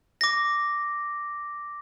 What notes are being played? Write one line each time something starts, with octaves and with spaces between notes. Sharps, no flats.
D6 A#6